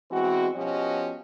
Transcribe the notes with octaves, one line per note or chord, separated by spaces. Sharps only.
B2 E3 G#3 C4 F#4
B2 F3 C#4 F#4 G4 D#5